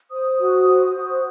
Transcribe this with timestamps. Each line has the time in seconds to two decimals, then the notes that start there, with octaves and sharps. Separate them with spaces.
0.11 C5 D#6
0.39 F#4
0.67 C5
0.96 F#4